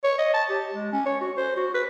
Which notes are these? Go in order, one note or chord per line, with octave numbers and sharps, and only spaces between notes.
C#5
D#5
A5
G4
G#3
C#4
C#5
F#4
C5
F#4
B4